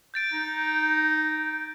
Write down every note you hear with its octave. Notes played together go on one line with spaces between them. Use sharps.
G6 A6 D7
D#4